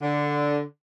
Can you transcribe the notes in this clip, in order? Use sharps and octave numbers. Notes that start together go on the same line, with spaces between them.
D3